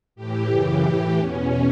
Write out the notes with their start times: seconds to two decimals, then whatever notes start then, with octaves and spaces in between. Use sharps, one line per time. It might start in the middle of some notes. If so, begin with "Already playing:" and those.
0.16 A2 E3 G4
0.49 F#2 C#3 E3 G4
0.82 A2 E3 G4
1.17 E2 B2 C#4